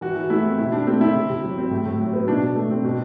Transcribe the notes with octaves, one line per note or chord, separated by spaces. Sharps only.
E3 F#4
E3
A3 E4
C4
B2 E4
B2 D4
A3 C4
C4 E4
C3
C3
F#3
C4
A2
A2
F#3
B3
B2 D4
B2
A3
C4
B2